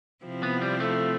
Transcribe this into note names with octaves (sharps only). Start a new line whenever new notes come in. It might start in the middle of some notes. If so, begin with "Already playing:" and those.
C3 F3 C4 E4
B3
G3
A3